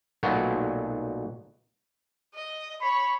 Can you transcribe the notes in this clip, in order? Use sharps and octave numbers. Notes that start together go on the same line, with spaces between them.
B1 A#2 F#3 A3 B3
D#5
C#5 B5